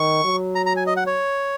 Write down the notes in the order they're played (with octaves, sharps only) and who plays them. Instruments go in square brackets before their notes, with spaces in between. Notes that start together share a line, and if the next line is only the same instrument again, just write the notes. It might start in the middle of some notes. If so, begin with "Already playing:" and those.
Already playing: [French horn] D#3 [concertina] C#6
[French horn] F#3
[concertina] A#5
A#5
G#5
D#5
F#5
C#5